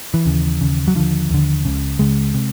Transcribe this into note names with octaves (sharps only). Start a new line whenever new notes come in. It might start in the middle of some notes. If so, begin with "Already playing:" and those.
E3
D#2 C#3
D#2 C#3
F#3
D#2 D3 F3
D#2 D3
C#2 C#3
C#2 C#3 G#3
C3